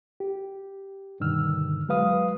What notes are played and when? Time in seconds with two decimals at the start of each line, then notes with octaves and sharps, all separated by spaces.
0.20 G4
1.20 G2 B2 D3 D#3 E6 F6
1.89 F#3 G#3 B4 F5 D#6